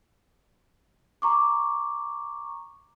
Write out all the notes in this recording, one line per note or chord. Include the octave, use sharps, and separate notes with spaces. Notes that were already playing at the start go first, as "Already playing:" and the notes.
A#5 C#6 D6